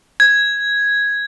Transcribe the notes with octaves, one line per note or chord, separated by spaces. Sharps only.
G#6